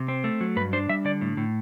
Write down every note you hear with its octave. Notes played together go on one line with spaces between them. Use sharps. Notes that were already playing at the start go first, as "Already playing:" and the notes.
Already playing: C3
C4
A3
F#3
G2 B4
D4 C5
G3 E5
D3 D5
A2
A2